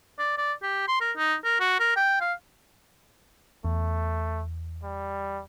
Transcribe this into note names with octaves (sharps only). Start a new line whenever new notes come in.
D5
D5
G4
C6
A#4
D#4
A#4
F#4
A#4
G5
F5
E2 A3
G3